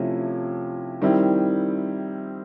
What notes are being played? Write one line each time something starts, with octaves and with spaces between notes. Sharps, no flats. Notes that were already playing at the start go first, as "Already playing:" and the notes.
Already playing: C3 F3 A3 C#4 E4
D#3 G3 C4 E4